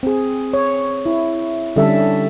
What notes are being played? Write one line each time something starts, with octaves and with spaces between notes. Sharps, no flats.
C4 G#4
C#5
E4
D3 G3 C#4 A4 E5